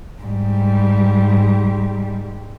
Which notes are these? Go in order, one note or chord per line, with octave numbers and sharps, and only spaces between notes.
G#2 G3